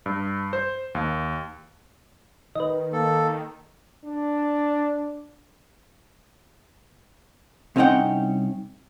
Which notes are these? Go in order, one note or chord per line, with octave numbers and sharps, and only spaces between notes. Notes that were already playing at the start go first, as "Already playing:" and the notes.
G2
C5
D#2
D#3 B4 D#5
A#3 A4
D4
C2 C4 C#4 D#4 F#5 G5